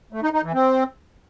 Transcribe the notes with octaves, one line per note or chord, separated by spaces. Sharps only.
A3
D#4
D#4
E3
C4